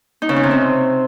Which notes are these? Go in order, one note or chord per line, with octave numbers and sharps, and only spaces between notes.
D#4
C#3
C#4
C3
C4